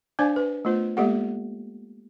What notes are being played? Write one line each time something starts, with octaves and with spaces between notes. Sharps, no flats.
D4 C5 D5 F5 G#5 D6
B4
A3 B3 F4 C5
G#3 A#3 B3 G4 A4 F#5